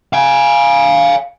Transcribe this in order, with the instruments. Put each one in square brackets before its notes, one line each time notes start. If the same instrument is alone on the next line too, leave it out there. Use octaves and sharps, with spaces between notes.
[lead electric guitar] F5 G#5